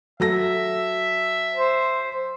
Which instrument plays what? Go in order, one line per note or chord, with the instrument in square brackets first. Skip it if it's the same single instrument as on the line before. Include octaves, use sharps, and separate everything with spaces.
[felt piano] F#3 A4 A#6 [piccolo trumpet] E5
[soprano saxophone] C5